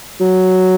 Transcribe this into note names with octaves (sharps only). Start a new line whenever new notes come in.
F#3